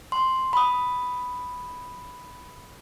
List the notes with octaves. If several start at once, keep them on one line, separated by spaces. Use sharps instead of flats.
C6
B5 D#6